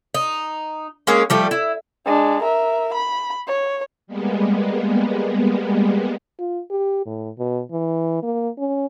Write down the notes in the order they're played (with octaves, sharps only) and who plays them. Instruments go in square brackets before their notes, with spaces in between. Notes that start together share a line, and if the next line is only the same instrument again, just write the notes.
[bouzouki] D#4
G#3 A#3 C#4 G#4
F3 G3 A3
E4
[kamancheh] G#3 D4
A#4 E5
B5
C#5
[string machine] G3 G#3 A#3 B3
[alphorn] F4
G4
A2
B2
E3
A#3
C#4